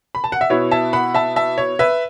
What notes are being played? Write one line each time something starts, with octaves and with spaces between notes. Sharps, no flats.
B5
A5
F#5
E5
B2 B3 E4 C#5
E5 A5
F#5 B5
E5 A5
E5 A5
C#5
B4 E5